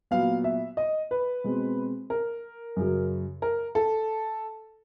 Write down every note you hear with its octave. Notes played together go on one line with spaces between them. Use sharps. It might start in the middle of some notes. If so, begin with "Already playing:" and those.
A#2 F#3 B3 F5
E5
D#5
B4
B2 G#3 C4
A#4
F#2 C#3 F#3
A#4
A4